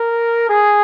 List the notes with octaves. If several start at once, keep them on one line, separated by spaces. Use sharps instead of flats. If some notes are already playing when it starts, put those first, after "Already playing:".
Already playing: A#4
G#4